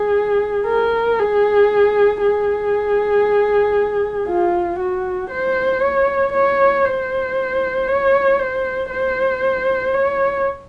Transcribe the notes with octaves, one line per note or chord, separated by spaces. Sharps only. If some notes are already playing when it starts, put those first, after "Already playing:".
Already playing: G#4
A#4
G#4
G#4
F4
F#4
C5
C#5
C#5
C5
C#5
C5
C5
C#5